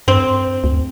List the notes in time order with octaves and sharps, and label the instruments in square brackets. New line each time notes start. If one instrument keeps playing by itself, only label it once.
[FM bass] G2 [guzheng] C4
[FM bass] D2